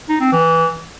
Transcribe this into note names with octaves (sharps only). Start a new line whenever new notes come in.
D#4
C4
E3